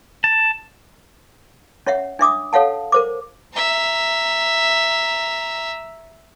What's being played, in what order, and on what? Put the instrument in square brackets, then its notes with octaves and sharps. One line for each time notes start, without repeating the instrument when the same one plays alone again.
[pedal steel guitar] A5
[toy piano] C#4 C#5 E5 F#5
D4 E5 D6 D#6
A4 C#5 F5 F#5 A5
A#4 C5 D6
[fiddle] E5 A#5